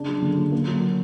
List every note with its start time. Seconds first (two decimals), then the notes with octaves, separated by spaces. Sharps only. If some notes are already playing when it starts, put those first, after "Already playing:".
Already playing: C#3 D4
0.08 F#3
0.22 D3
0.37 F#3
0.52 A#3
0.67 F#3